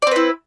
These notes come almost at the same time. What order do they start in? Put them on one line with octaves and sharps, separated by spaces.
D5 C4 B4 E4